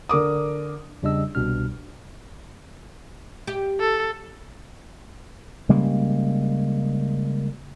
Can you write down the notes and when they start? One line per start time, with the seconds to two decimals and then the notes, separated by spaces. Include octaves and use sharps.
0.09 D3 A#4 D6 D#6
1.02 E2 C#3 G3 D4 D#5 E6
1.35 C2 B2 G3 D4 F6
3.47 G4
3.80 A4
5.69 C#3 G3 G#3 A#3